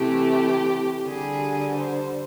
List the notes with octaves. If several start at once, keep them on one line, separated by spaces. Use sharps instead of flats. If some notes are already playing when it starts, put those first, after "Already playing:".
Already playing: C3 E3 A3 G4
D3 G3 G#4
C5